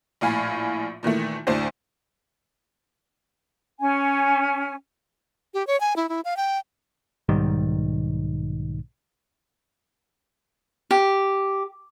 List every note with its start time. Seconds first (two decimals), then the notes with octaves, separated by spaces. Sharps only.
0.21 A#1 A2 F5 G#5 B5
1.03 A#2 D#3 E3 A3
1.47 D2 A2 D4 C5
3.79 C#4 G#5
5.54 G4
5.67 C#5
5.81 G#5
5.96 E4
6.09 E4
6.25 F5
6.37 G5
7.29 B1 G#2 D#3 G3
10.91 G4